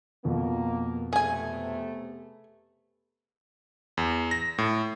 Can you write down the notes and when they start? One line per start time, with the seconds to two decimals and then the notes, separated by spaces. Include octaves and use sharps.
0.25 F2 B2 A#3
1.13 C3 A3 B3 G#4 G#5
3.97 E2
4.31 A#6
4.58 A2